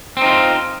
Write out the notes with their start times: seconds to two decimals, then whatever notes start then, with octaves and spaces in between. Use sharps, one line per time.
0.17 C4
0.21 D#4
0.26 F4